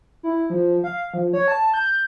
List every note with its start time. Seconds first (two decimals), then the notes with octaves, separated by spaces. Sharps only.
0.23 E4
0.50 F3
0.84 F5
1.14 F3
1.33 C#5
1.48 A5
1.74 G6